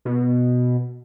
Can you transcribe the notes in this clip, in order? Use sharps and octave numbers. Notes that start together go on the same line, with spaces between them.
B2